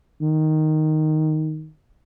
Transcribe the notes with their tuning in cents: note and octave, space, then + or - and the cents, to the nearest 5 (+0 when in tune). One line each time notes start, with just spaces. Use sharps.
D#3 +0